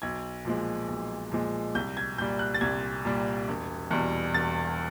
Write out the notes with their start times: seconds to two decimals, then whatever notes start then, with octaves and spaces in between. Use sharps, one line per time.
0.02 B1 G#6
0.45 A#2 F3 G#3
0.89 B1
1.32 A#2 F3 G#3
1.75 C2 G6
1.97 G#6
2.18 A#2 G3 G6
2.39 F#6
2.54 A6
2.61 C2 G#6
3.05 A#2 G3
3.48 E1
3.91 E2 B2 G3
4.34 E1 A6